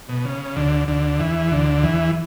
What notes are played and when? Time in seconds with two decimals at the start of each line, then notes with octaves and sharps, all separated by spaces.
0.09 B2
0.25 C#3
0.56 D2 D3
0.88 D2 D3
1.19 E2 E3
1.52 D2 D3
1.83 E2 E3